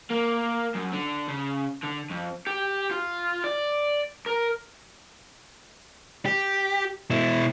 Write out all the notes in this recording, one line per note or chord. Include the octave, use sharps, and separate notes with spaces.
A#3
F#2
D3
C#3
D3
F2
G4
F4
D5
A#4
G4
B2 E4